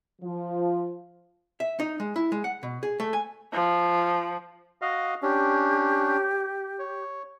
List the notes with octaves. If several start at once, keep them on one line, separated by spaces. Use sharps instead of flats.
F3
E5
D#4
G#3
E4
G#3
F#5
B2
G#4
A3
G#5
F3
F#4 D#5 F5
C#4 D4 G4
C#5